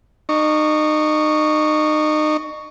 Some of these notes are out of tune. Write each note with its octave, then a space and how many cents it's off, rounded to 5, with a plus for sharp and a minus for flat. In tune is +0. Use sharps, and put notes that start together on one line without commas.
D#4 -30 C#6 +10